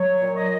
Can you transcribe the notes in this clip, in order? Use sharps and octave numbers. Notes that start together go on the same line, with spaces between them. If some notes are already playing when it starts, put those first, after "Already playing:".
Already playing: F#3 C#5
A#2
D#5